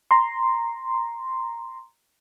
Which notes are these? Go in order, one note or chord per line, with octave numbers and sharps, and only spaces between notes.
A#5 C6